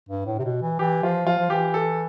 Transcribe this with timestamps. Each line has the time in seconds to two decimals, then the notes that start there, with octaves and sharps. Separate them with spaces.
0.09 G2
0.26 A2
0.39 C3
0.45 B2
0.62 E3
0.79 E3 G4
1.03 F3 F4
1.27 F3 F4
1.38 F3
1.50 E3 G4
1.74 A4